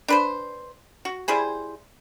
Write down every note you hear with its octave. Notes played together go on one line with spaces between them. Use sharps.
D4 B4 C5
F#4
G3 E4 G#4 C5